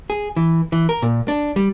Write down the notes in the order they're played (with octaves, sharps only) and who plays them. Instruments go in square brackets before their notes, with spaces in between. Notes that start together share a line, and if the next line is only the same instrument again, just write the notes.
[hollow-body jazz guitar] G#4
E3
E3
A#4
A#2
D4
G3